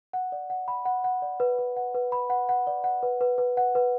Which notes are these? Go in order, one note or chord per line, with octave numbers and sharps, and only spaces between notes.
F#5
D5
F#5
B5
F#5
F#5
D5
B4
B4
F#5
B4
B5
F#5
F#5
D5
F#5
B4
B4
B4
F#5
B4